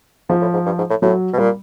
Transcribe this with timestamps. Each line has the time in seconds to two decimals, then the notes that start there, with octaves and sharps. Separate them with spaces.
0.29 G#2 F3
0.41 A2
0.54 G#2
0.66 G2
0.78 G#2
0.90 A2
1.02 A2 F#3
1.33 B2
1.38 A#2 G3